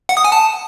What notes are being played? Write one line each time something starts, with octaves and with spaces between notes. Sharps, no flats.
F#5
D#6
G#5
A5